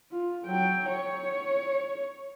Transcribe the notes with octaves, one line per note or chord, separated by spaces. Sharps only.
F4
F#3 G5
C#5